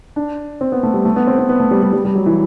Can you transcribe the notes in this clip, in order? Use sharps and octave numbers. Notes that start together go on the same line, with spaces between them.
D4
C4
B3
A3
G3
A3
B3
C4
B3
B3
A3
G3
G3
G3
G3
F#3
E3